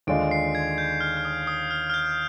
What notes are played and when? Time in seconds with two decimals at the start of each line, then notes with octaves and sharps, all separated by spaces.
0.07 D#2 D3 G#3 D4 F4 D7
0.31 C7
0.55 G#6
0.78 G6
1.01 F6
1.17 F6
1.25 D#6
1.47 D#6
1.71 F6
1.90 F6
1.94 G6